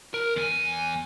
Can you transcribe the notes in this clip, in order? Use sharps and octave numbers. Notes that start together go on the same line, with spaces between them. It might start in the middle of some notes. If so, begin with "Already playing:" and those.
A#4
E2 G#5